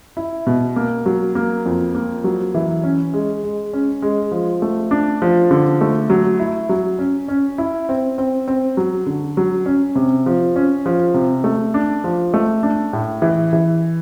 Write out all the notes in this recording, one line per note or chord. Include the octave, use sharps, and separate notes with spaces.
E4
B2
A#3
F#3
A#3
F2
A#3
F#3
E3
C#4
G#3
G#3
C#4
G#3
F3
A3
D4
F3
D3
A3
F#3
E4
F#3
C#4
C#4
E4
C4
C4
C4
F#3
D3
F#3
C#4
C3
F3
C#4
F3
C3
A3
D4
F3
A3
D4
A2
E3
E3